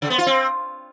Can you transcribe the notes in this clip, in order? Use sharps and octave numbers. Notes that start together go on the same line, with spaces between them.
C#3
B3
F4
C4